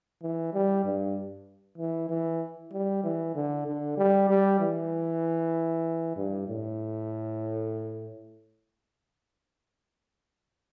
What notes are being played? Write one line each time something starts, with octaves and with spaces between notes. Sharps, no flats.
E3
G3
G2
E3
E3
G3
E3
D3
D3
G3
G3
E3
G2
A2